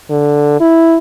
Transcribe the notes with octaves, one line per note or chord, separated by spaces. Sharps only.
D3
E4